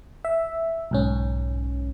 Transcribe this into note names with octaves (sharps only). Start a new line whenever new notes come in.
E5
B1 G#2 C#4